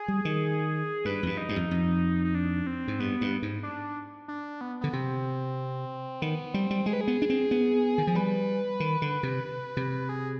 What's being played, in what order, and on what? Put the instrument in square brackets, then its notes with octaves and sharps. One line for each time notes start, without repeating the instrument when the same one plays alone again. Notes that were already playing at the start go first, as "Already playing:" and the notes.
Already playing: [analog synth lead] G#4
[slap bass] G3
D#3
[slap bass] G2 [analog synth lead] B4
[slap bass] F2
G2
[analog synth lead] D#4
[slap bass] G2
F2
F2
[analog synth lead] D#4
D4
C4
[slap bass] G#2
[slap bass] G2 [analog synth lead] B3
[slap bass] G2
G#2
[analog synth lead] D4
D4
B3
[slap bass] D3 [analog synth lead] B3
[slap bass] C3 [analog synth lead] C4
[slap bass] D#3 [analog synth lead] B3
[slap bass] G3 [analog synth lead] C4
[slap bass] G3
[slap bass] G#3 [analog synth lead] G#4
[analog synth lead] B4
G#4
[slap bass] B3
D4
C4
B3
D#3
F3
[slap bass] G3 [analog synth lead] B4
[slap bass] D#3
D3
C3
C3
[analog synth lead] G#4